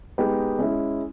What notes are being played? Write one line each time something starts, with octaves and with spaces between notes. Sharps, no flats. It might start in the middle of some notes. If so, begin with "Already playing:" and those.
G#3 B3 D#4 G4 B4
G#3 C#4 E4